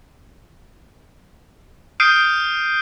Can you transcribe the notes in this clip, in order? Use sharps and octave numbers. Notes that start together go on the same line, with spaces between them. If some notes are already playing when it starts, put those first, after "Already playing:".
D#6 F6 G6 C7 D7 D#7